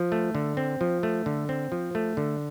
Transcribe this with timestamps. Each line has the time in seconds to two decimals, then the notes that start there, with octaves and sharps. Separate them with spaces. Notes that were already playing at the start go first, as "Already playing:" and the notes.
Already playing: F3
0.12 A3
0.35 D3
0.57 C4
0.81 F3
1.03 A3
1.26 D3
1.49 C4
1.72 F3
1.95 A3
2.17 D3